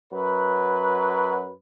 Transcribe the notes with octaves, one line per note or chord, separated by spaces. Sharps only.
F#2 F#3 B4